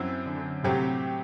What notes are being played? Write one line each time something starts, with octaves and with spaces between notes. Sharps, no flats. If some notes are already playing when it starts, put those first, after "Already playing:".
Already playing: F#2 F#3 C4 E4
D3
A2 C3 F#3 C4 G4